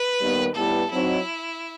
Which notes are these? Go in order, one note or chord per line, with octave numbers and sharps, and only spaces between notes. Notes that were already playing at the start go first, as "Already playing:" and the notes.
Already playing: B4
D#2 D#3 G3 B3
A2 G3 B3 E4 A4 B4
F#3 C4 D#4 E4